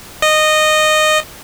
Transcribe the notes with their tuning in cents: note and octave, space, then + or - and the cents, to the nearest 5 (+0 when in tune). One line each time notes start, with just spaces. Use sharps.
D#5 -15